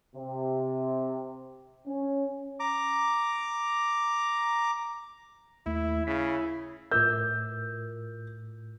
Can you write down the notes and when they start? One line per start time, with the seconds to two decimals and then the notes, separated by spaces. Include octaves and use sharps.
0.15 C3
1.86 C#4
2.60 A#5 D6
5.66 D#2 A3 E4
6.07 C#3 E4 B6
6.91 A2 F4 A#4 E6 G6